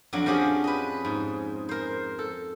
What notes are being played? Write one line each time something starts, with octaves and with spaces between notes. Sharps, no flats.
F2 F#3 D4
F3 C#4 D4 G4 G#4
B4 D#5
G#2
A#4 C5
A4